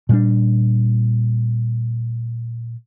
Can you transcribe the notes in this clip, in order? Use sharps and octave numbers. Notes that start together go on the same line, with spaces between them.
A#2 G3 D4